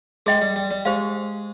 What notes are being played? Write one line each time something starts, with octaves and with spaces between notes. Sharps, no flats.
G#3 G#4 D#5 G5
G3
G3
G3
G#3 G4 C5 F5